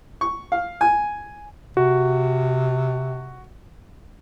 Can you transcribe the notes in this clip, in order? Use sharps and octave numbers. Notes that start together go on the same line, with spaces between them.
C#6
F5
G#5
C3 F#4